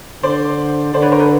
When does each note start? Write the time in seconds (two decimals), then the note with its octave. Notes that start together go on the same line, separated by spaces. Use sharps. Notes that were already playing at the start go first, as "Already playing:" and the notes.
0.23 D3 C5 D5
0.94 D3 C5 D5
1.02 B4 C#5
1.12 A#4 C5
1.20 A4 B4